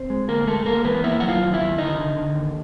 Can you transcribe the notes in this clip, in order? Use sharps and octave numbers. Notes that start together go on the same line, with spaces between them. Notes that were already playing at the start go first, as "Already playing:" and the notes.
Already playing: C4 C5
G#3
D2 A#3 A#4
G#3 A3 A4
G#3 A#3 A#4
E3 B3 B4
A#3 E4 E5
F#3 F#5
F4 F5
D#2
E4 E5
D#2
D3 D#4 D#5
D3
D3
D#2